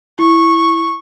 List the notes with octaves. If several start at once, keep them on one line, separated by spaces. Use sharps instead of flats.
E4 C#6